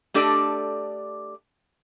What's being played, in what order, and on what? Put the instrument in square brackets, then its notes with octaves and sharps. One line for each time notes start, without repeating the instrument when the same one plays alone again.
[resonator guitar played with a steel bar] A3 D4 G4 A4 D5 D#5